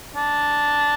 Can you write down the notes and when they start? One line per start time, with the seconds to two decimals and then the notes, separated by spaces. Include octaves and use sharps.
0.16 D4